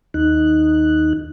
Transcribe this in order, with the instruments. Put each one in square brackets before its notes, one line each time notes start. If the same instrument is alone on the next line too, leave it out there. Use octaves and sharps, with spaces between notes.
[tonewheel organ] D#2 D#4 F#6